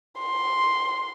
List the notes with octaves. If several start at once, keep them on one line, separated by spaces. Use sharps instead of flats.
C6